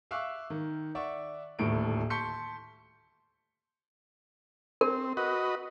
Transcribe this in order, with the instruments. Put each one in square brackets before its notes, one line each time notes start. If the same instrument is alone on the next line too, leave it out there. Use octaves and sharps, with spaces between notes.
[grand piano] E5 F5 C#6 D6 E6 F#6
D#3
D5 E5 F#5 C#6
D#1 D2 A2 A3 D7
A5 C6 C#6 G6 B6 C#7
[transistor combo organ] C4 [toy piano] A#4
[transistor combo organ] F#4 B4 D#5